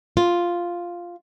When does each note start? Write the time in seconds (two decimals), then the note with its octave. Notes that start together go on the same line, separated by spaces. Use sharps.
0.17 F4